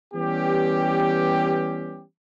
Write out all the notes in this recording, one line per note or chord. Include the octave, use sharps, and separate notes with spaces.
E3 G3 B3 C#4 G4